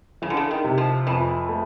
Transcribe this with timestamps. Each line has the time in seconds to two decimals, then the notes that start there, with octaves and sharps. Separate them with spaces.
0.22 C#3 E3
0.30 D3
0.37 C#3
0.51 D#3
0.64 C3
0.78 F3
1.07 F2 E3
1.49 A3